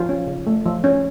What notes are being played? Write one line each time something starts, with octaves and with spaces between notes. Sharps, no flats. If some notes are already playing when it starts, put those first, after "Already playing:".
Already playing: F3 F4
C#4
C#3
A3
F3
C#4